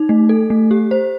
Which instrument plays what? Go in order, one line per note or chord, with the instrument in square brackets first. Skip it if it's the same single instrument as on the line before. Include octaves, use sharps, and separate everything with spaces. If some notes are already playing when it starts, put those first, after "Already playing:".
Already playing: [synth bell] D#4
A3
A4
A3
G4
C5